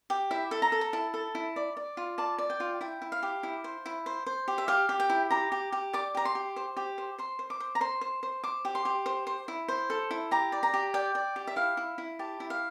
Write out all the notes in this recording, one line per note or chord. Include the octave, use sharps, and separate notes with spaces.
G4
E4 E5
A4
A#5
A4
A#5
E4 A5
A4
E4
D5
D5
F4
D5 A5
D5
G5
F4
E4 G5
E4
F5
G4
E4
C5
E4
C5
C5
G4
E5
G4 F5
G4
G5
E4
G4 A#5
G4
G4
D5 D6
G4 A#5
C6
G4
C5
G4
C5
C5 C6
C5
D6
C5
A#5
C5 C6
C5
C5
C5 D6
G4
C6
G4
C5
C5
E4
C5
A4
E4
G4 A#5
D5
A#5
G4
D5 G5
D5
G4
E5
E4 F5
E4
E4
G4 A5
E4
F5